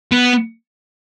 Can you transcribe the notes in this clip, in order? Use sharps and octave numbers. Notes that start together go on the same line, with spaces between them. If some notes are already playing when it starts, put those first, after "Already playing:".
B3